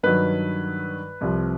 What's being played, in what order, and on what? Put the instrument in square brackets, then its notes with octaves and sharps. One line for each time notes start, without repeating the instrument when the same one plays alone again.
[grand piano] G2 D#3 F#3 B4
C2 C3 F3